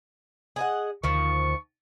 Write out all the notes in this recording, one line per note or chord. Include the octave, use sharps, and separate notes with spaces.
G#4 D#5 F#5
D2 D#3 F3 C#6